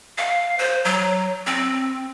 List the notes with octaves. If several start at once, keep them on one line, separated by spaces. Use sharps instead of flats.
F5
C5
F#3
C4